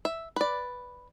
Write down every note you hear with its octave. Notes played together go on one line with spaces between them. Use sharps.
E5
B4 D5